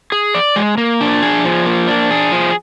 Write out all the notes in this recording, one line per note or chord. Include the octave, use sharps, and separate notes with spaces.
G#4
D5
G#3
A#3
D4
G#4
F3
A#3
D4
G#4
F3